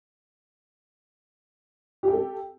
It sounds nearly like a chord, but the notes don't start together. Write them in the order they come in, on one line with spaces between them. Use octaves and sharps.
G4 G5 A4